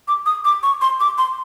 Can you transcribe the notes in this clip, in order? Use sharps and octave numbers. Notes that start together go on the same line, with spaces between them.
D6
D#6
D6
C#6
C6
D6
C6